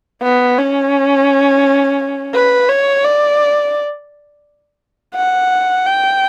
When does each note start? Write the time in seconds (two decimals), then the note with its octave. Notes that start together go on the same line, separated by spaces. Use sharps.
0.23 B3
0.58 C#4
2.34 B4
2.69 C#5
3.05 D5
5.16 F#5
5.87 G5